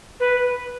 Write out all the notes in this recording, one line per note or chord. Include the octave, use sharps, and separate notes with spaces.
B4